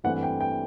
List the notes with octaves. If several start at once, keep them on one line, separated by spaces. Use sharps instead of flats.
G2 E3 A3 C4 F#5
G5
G5